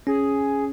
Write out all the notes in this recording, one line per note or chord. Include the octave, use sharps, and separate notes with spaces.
C#4 G#4